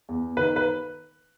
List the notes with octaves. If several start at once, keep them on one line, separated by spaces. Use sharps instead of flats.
E2
D#3 B4
B4